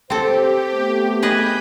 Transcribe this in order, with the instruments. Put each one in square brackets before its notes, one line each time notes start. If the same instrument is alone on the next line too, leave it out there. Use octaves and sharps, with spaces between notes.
[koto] C4 A4 [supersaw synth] G4 [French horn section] C5
[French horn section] A3 B3
[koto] G#4 B4 D#5 [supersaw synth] B5 G6